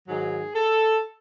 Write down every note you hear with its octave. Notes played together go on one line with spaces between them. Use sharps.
G#2 D#3 F#3 G#4
A4